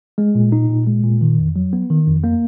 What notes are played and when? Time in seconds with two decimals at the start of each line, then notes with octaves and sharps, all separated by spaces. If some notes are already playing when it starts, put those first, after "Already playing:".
0.18 G#3
0.35 A#2
0.52 D#4
0.69 A#2
0.87 G#3
1.04 A#2
1.21 D#3
1.39 F2
1.56 F#3
1.73 B3
1.90 D#3
2.07 F2
2.24 A#3